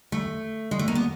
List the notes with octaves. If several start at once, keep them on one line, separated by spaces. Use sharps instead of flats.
A3
G#3
A3
A#3
B3